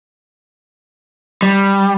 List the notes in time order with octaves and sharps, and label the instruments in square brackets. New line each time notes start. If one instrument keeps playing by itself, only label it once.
[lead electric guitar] G3